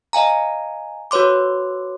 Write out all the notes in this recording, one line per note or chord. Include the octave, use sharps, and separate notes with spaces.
D#5 F5 G#5 A#5
F#4 B4 C#5 C6 D6